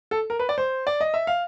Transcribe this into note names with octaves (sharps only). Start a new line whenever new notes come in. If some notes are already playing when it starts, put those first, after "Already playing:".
A4
A#4
B4
D5
C5
D5
D#5
E5
F5